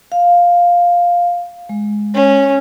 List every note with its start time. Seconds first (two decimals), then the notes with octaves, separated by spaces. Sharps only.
0.12 F5
1.69 G#3
2.15 C#4